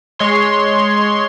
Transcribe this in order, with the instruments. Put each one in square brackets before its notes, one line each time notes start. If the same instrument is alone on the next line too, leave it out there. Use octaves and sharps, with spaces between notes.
[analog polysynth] G#3 C#5 C6